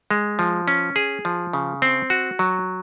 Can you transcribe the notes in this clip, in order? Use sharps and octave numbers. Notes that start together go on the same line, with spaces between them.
G#3
F3
C#4
G#4
F3
C#3
C4
F#4
F#3